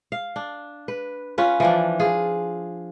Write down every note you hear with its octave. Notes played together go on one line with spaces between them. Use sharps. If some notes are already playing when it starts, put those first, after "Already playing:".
F5
D4
B4
C#4 F4 B4
E3 F3 D4
F4 G#4